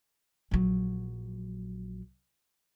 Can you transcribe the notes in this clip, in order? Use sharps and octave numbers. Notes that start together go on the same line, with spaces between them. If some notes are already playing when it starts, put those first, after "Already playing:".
A#1 F#3